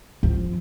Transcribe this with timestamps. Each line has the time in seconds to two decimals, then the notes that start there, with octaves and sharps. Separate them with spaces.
0.23 F3